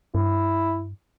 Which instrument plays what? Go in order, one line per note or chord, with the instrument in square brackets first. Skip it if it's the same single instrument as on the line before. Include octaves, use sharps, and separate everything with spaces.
[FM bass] G2 [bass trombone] E4